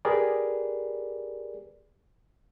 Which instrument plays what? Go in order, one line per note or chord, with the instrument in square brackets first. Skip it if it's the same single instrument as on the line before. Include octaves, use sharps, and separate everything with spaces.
[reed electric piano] G4 G#4 A#4 B4 D5